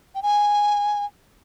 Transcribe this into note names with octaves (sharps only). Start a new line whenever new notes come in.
G5
G#5